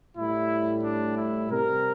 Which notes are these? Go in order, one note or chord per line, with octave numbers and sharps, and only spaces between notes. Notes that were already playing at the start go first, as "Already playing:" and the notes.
A2 G3 E4
D4
E4
C3 G3 A#4